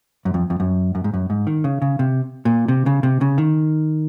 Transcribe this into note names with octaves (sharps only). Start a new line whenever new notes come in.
F#2
F2
F2
F#2
F#2
G#2
F#2
G#2
D#3
C#3
C#3
C3
A#2
C3
C#3
C3
C#3
D#3